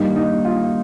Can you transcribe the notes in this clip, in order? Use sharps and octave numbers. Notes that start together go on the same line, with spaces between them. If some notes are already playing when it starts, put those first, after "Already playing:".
Already playing: G2 D#3 G3 A#3 D#4
D#4
F4